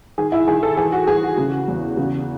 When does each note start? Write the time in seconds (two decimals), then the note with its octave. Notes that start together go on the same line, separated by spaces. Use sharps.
0.18 D#3 G#4
0.32 E4
0.47 D#3 G#4
0.63 A4
0.77 E3 G#4
0.92 F#4
1.07 E3 G#4
1.23 F#4
1.37 C#3
1.68 E2
1.97 C#3